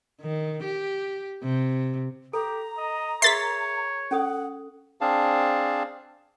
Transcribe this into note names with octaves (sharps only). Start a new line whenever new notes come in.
D#3
G4
C3
G4 A4 A#5
D#5
G#4 A#4 C#5 E5 C6 A6 B6
C#4 A4 F#5 D#6
C4 D4 G#4 F5 A5